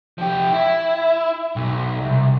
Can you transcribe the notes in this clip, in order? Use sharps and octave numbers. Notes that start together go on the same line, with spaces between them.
F3 G4
E4
B1
C2